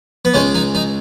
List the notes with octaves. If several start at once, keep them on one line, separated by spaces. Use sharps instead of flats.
B3
C#2 C#3 G#3 C#4
D#4
D#4